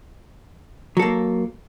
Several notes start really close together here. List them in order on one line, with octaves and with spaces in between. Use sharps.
F#3 A4 A#3